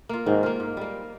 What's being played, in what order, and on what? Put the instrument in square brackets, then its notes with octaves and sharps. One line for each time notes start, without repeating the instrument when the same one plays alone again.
[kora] A#3 F4
[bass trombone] G#2 [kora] D#3
[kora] A#3 F4
G#2
G3 A#3